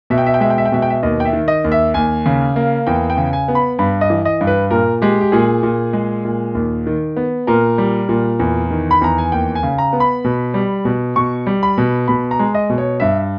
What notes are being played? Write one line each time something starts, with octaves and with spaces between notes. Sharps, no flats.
B2 E5
G5
E5
G5
G#3 E5
G5
E5
G5
B2 E5
G5
E5
D#2 D#5
G5
E5
D#3
D#5
D#2
E5
D#2 G#5
C#3
A#3
E2 G5
G5
C#3
G#5
B3
B5
G2 B5
D#5
E3
D#5
G2
B4
A#2 A#4
G#3 G4
G4
A#2 G#4
A#2
G#3
A#2
D#2
D#3
B3
A#2 A#4
G3
A#2
E2
D#3
B5
E2 A#5
G#5
D#2 G5
G#5
C#3
A#5
B3
B5
B2
G3
B2
B2 C#6
G3
B5
B2
B2 B5
A#5
G#3
D#5
B2
C#5
G2 E5